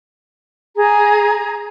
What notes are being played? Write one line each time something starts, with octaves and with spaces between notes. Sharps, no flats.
G#4 A#5